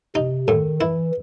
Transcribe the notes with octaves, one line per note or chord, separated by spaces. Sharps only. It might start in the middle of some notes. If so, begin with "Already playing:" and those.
C3 D#4
A2 D#3
E3 E4